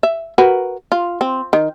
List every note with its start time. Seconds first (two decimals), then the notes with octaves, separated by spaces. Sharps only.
0.03 E5
0.38 F#4 A#4 B4
0.92 F4
1.21 C4
1.53 D#3